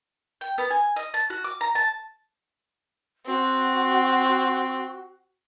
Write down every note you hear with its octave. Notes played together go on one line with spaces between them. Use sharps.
G5
B3
G#5
D#5
A5
F#4
D6
A#5
A5
C4 F#4